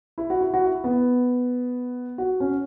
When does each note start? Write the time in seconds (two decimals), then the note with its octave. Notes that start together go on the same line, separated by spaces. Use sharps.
0.18 E4
0.30 F#4
0.41 E4
0.54 F#4
0.66 E4
0.84 B3
2.18 F#4
2.40 C#4